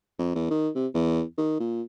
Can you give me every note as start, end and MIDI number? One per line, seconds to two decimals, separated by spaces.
0.19 0.33 41
0.35 0.49 40
0.50 0.69 51
0.75 0.87 48
0.94 1.22 40
1.38 1.55 51
1.60 1.82 46